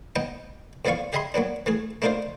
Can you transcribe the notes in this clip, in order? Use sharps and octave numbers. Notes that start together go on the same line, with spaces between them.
B3 D#4 D#5 G5
F2 E3 B3 D5 F5 C#6
G4 G#4 D#5 E5 B5 C6
F#3 A#3 B3 D4
E3 A3 G#4
A3 A#3 D4 D#4 F4 C5